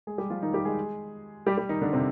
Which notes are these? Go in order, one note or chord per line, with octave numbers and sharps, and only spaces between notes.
G#3 G#4
G3 G4
F3 F4
D#3 D#4
G3 G4
G#3 G#4
G3 G4
G3 G4
D#3 D#4
D3 D4
C3 C4